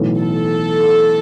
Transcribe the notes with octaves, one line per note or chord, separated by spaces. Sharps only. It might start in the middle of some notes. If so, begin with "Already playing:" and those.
Already playing: B1 A2 E3 B3
A4